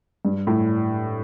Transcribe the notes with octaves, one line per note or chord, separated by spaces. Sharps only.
G2
A2